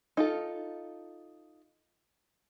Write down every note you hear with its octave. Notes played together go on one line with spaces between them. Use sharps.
D#4 F4 A4